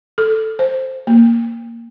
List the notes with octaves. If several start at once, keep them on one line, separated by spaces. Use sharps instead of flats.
A4
C5
A#3